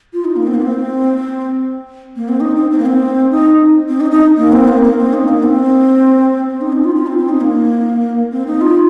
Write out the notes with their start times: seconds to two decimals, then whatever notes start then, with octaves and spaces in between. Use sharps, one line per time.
0.13 F4
0.25 D#4
0.36 A#3
0.47 C4
0.55 A#3
0.62 C4
2.16 A#3
2.29 C4
2.40 D#4
2.56 C4
2.71 C4
2.79 A#3
2.86 C4
3.32 D#4
3.89 C4
4.00 D#4
4.11 D#4
4.38 A#3
4.52 C4
4.68 A#3
4.83 A#3
4.98 C4
5.14 D#4
5.28 A#3
5.43 C4
6.50 C4
6.61 D#4
6.72 C4
6.84 F4
6.95 F4
7.07 C4
7.18 C4
7.29 D#4
7.41 A#3
8.32 C4
8.47 D#4
8.61 F4